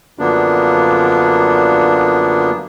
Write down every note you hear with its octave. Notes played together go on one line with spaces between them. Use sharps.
F#2 D3 F3 A#3 B3 D4